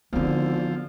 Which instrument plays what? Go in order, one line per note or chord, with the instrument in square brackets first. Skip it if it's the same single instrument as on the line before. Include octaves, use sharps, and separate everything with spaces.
[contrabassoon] G#1 [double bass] D3 [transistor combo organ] F3 [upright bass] B3 C4